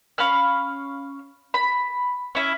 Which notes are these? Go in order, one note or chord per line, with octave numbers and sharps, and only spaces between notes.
C#4 F5 B5 F6
B5
C#4 E4